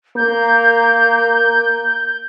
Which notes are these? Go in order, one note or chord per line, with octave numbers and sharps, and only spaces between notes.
A#3 G6